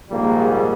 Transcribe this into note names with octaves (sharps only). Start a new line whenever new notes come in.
A#1 G#2 D#3 G3 A#3